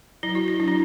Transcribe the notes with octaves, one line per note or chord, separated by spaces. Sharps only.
F#3 E4
F#4
E4
F#3 D4
E4